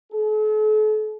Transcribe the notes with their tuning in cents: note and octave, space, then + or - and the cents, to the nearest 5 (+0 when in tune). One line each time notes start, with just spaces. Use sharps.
A4 -45